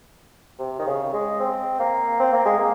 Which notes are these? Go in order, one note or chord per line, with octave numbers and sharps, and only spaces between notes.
C3
D#3
C#3
G#3
C4
A#3
C4
A#3
G#3
A#3